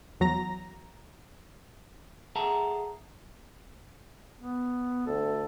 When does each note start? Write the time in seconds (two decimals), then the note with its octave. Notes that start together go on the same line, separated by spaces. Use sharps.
0.20 E2 F#3 A#5 A#6
2.36 G#4 A4 E5 F#5 A5 A#5
4.40 B3
5.06 D2 A4